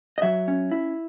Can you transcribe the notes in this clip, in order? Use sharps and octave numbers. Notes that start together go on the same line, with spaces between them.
D#5
F#3 E5
C#4
E4